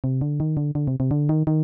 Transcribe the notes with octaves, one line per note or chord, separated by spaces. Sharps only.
C3
D3
D#3
D3
D3
C3
C3
D3
D#3
D#3